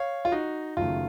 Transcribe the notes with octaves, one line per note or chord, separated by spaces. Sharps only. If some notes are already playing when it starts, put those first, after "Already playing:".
Already playing: C#5 F5
F4
D#4 F#4
F#1 F#2 D#3 A3 F4